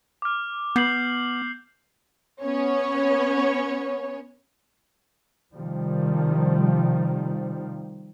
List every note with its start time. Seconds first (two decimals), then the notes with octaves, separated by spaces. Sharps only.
0.22 D6 F6
0.76 B3 G6 C7 F#7
2.40 B3 C#4 C#5
5.53 C3 D#3 F3 G3